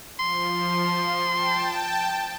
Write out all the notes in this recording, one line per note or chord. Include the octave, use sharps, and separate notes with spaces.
F3 C6
G5 A5